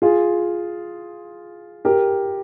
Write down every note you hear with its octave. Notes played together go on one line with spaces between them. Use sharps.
F4 G#4
G4 A#4